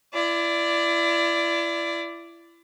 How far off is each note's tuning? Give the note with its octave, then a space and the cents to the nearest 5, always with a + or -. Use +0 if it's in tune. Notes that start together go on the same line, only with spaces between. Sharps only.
E4 +35 D5 +0